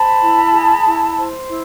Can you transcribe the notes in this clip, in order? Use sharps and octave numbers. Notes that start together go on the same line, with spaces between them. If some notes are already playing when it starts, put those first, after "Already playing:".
Already playing: C5 A5 B5
E4
G#4
E4
C5
E4